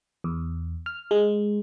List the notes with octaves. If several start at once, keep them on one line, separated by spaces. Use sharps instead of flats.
E2
F6
G#3